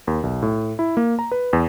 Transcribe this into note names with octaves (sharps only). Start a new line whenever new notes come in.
D#2
B1
A2
E4
A#3
A#5
B4
E2